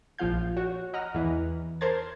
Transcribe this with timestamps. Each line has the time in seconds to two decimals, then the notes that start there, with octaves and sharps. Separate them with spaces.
0.18 A#1 F3 F4 F5 G6
0.57 F#4 C#5
0.94 D#5 F#5 A#5 F6
1.15 E2 E3
1.81 A#4 C5 A5 G#6